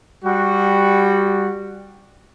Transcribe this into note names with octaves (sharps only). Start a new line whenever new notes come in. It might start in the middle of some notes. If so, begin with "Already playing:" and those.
G3 F#4